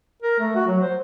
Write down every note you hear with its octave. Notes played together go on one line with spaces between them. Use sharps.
A#4
A3
F#4
F#3
C5